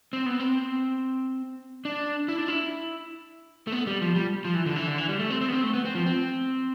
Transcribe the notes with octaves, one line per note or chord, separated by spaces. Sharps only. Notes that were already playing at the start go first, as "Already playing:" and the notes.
C4
B3
C4
D4
E4
D4
E4
A3
B3
G3
F3
G3
F3
E3
D3
E3
D3
E3
G3
A3
C4
C4
B3
C4
A3
B3
C4
F3
C4